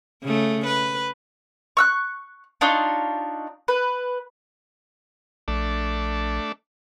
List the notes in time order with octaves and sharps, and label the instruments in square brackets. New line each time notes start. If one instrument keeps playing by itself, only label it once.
[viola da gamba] C#3 A3
B4
[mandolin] C#6 E6 F#6
D4 D#4 F4 C#5
B4
[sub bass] A#1 [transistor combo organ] A3 D4